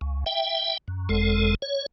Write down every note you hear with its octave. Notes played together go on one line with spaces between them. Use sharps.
C#2
E5 G5
F#2
F#1 F2 G#3 A4
C#5